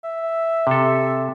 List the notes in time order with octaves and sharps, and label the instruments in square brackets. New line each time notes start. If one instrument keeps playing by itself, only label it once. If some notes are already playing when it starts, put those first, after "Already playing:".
[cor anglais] E5
[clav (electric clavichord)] C3 A4